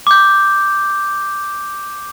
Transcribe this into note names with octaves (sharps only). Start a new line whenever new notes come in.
D6 G6